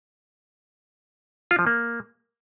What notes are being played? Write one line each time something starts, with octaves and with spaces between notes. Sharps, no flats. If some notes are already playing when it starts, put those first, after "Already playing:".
F4
F3
A#3